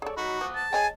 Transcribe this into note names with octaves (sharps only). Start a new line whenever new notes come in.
G#4 A4 C#5 D5
F#3 D#4 F#4 B5
F3 F#5 D6 D#6
A5
G#4 C#5 D#5 G5 G#5